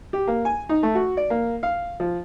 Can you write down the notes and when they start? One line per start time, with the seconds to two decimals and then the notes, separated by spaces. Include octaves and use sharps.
0.13 G4
0.28 A#3
0.45 G#5
0.69 D#4
0.83 A3
0.95 F#4
1.17 D5
1.30 A#3
1.63 F5
2.00 F3